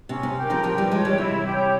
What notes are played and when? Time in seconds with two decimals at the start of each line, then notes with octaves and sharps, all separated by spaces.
0.09 C3 C#4
0.23 C3
0.37 G4 A#4
0.50 C#3 F3
0.63 C#3 F3 G4
0.78 E3 G3
0.91 F3 G#3 C#5 G5
1.05 E3 G3
1.18 C3 E4
1.45 G4 C#5